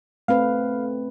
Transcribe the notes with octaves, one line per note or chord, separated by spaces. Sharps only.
A3 C4 B4 F5